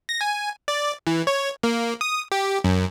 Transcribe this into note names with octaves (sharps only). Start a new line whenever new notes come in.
A#6
G#5
D5
E3
C#5
A#3
D#6
G4
F#2